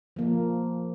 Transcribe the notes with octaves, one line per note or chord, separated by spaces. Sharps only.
F3 A#3